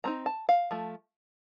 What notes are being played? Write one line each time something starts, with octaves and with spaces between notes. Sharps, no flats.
F3 C4 D#4 A#5
A5
F5
F3 A3